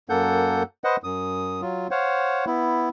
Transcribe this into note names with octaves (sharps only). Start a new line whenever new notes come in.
F#2 A#3 A4 F#5 G6
B4 C5 D#5 F#5
F#2 D#6
F#3 F4
C5 C#5 F5 F#5
B3 E4